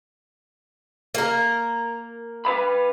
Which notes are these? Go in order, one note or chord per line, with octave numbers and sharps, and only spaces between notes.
A#3 A#4
B4 F5 B5